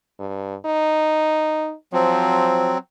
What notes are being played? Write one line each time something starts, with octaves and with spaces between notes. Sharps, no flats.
G2
D#4
F3 F#3 C4